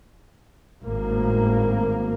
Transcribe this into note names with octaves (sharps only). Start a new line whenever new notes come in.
G#1 A2 A#3